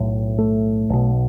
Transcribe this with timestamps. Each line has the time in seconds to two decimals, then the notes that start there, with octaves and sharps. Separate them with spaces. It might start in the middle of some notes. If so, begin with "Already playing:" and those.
Already playing: B1 A2
0.38 A3
0.89 B1 B2